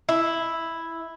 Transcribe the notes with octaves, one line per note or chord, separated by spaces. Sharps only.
E4